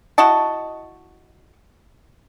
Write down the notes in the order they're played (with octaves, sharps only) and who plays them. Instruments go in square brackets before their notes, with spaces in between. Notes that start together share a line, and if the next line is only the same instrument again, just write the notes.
[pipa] E4 F#4 D#5 A5